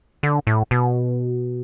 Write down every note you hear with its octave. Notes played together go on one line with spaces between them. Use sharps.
D3
A2
B2